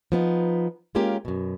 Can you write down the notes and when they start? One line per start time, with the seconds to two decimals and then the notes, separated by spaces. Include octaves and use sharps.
0.12 F3 B3 D#4
0.95 G#3 A#3 C#4 F4 G4 A#4
1.25 F#2 B2